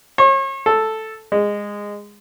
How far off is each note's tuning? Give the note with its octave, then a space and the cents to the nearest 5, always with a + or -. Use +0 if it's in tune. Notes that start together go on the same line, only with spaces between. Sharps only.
C#5 -40
A4 +0
G#3 -15